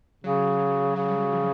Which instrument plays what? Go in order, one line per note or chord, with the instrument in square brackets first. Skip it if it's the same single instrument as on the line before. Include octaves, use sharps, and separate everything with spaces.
[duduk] C#3 [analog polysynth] F#3
[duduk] C#3 [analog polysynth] F#3
[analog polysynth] G3
F#3
F3